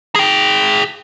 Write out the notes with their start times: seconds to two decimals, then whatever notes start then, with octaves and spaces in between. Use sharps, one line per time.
0.15 G#4 G5